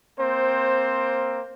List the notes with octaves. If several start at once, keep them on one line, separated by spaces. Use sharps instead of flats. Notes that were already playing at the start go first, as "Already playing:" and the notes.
A#3 C4 C5